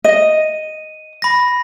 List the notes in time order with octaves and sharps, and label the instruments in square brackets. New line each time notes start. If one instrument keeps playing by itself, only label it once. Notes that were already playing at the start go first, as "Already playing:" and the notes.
[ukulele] D#5 [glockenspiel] D#7
[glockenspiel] B5 A#6